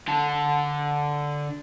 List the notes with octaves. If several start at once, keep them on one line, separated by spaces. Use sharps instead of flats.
D3 A5